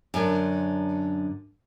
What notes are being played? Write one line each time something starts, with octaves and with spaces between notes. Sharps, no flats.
F#2 D3